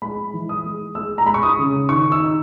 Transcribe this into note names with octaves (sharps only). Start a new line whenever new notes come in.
G#3 B5
E3
D#6
G#3
G#3 E6
A#5
G#3 B5
C#6
D#6
C#3
D#3 C#6
E6
D#4